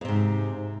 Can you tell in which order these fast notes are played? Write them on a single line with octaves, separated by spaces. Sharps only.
F2 C3 G#2